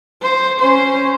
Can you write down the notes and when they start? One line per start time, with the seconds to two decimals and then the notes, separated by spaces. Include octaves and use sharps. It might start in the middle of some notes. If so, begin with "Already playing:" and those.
0.21 C5
0.59 C#4 C5